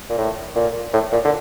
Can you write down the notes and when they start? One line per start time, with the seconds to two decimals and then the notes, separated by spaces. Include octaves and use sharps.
0.10 A#2
0.18 A2
0.56 A#2
0.94 A2
1.12 A#2
1.25 D3